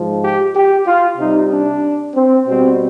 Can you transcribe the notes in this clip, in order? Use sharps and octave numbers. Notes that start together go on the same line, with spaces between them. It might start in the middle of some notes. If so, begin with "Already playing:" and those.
Already playing: G#2 F3 G#3
G4
G4
F4
C3 G3 D#4
D4
C4
B2 G3 C4